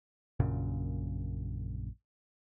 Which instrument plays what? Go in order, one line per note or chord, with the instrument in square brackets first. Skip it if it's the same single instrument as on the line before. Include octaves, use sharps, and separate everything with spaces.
[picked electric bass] A#1 F#2 A#2 C#3